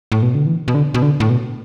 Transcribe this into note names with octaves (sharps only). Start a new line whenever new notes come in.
A2
B2
D3
E3
B2
D3
B2
D3
A2
B2